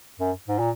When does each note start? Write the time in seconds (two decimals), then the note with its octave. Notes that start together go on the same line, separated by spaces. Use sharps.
0.19 F#2
0.48 G#2
0.58 A#2